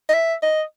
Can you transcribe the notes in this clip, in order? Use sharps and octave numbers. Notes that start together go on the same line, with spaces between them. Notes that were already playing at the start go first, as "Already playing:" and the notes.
D#5
E5
D#5